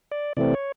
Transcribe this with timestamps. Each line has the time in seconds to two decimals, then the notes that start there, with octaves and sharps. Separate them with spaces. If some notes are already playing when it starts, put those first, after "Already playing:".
0.12 D5
0.37 C3 E3 A3 C4 D5
0.54 C#5